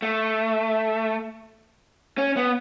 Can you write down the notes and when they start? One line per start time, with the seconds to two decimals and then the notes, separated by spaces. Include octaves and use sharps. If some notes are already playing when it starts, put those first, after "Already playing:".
0.02 A3
2.18 C#4
2.36 B3